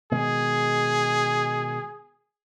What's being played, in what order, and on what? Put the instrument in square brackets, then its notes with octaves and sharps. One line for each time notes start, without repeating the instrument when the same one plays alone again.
[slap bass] B2 D#3 G#3 [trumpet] G#4